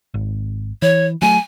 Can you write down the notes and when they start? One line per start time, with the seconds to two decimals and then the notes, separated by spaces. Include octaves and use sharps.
0.14 G#1
0.82 E3 C#5
1.22 F#3 A3 G#5